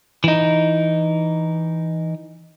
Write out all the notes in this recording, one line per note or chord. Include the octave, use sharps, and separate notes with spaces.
E3 D#4